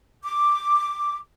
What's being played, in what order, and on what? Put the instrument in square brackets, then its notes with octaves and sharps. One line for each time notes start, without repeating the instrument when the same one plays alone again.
[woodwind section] D6